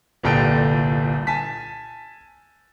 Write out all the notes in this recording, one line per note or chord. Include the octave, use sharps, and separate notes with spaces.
G1 C2 A#2 A4 G5 D7
G#5 A5 B6